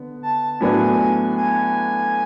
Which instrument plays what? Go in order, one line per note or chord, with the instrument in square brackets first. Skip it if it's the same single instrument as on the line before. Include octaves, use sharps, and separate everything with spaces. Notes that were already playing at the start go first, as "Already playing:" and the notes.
Already playing: [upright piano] D3 B3
[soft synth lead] A5
[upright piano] A2 F#3 B3 D4 [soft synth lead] G#5
[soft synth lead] G#5